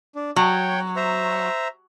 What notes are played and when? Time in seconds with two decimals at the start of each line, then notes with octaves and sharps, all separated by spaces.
0.15 D4
0.36 F#3 C#5 G5
0.96 C5 E5 A#5